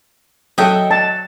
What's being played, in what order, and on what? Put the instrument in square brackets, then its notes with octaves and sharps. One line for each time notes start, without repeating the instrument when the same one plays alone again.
[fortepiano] F#3 A4 [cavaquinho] D#5 E5 G5
[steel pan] A5